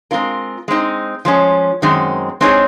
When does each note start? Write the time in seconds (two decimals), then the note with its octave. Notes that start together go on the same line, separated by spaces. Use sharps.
0.11 G#3 C4 F4 A#4
0.68 G#3 C4 D#4
1.25 F3 G#3 C#4
1.82 F#2 D#3 G#3 C4
2.41 G#3 C4 D#4 G#4 C#5